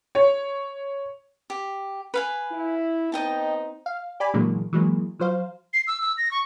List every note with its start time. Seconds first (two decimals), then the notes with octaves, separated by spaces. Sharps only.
0.15 C#5
1.50 G4
2.14 B4 F5 G#5
2.52 E4
3.12 B3 C4 D#4 D#5 G5 A5
3.86 F5
4.20 G4 D5 G#5 B5
4.34 A#2 D3 E3 F#3 G#3 A#3
4.73 E3 F#3 G#3 A#3
5.19 F3 F#3 C5 F5
5.73 C7
5.87 E6
6.01 E6
6.18 A#6
6.31 C#6